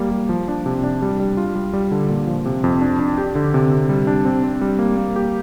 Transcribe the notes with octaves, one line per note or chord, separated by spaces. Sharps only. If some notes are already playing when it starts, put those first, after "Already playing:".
Already playing: G3 A#3
G3
F3
D4
C3
D4
G3
G3
F4
G3
G3
D3
A#2
F3
C3
F2
D4
D4
G4
D3
C3
C3
G3
D4
C4
C4
G3
A#3
A#3
G4